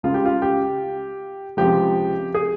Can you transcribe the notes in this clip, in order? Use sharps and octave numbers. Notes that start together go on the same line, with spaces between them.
C#2 C#3 G#3 F4
G4
F4
G4
C#2 C3 F3 G#3 G4
G#4